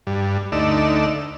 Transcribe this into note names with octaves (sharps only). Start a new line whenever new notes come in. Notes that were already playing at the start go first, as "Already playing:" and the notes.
G2
D2 A3 D#4 D5 E6